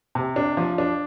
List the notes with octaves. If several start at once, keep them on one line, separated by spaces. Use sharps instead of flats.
C3
D4
F3
D4